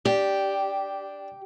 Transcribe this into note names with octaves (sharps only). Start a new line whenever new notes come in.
D4 G4